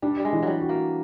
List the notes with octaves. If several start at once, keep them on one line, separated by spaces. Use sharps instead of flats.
G3 D4
G3
G#3
E3
F#3 G3
F#4
A#3